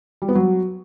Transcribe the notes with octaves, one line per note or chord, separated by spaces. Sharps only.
G3
B3
F#3